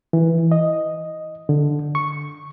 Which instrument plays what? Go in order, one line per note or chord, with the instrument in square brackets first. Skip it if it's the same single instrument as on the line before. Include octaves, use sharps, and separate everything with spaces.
[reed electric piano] E3
D#5
D3
C#6